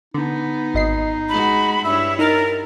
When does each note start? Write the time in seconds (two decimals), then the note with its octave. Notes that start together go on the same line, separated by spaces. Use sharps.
0.14 D3 B3 D#4
0.74 G#1 D#5 C7
1.29 G#3 F#4 B5
1.84 G2 E4 C#5 E5
2.19 D#4 A#4 F6 A6